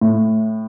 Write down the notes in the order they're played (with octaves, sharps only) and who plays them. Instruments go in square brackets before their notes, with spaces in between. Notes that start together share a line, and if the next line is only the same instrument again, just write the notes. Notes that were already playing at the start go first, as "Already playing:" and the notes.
[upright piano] A2